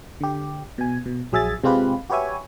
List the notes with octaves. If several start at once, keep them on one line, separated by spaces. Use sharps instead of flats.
D3 G4
B2 G#5
B2
A#1 F#3 G#4 E5 G#5 A6
C3 G#3 C4 F4 G4 B4
F#4 G4 B4 C#5 E5 G#5